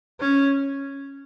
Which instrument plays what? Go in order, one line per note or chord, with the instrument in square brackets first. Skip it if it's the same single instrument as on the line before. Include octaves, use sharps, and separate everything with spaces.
[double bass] C#4